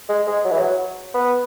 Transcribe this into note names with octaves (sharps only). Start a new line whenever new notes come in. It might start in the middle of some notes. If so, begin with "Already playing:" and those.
G#3
G#3
F#3
E3
F#3
B3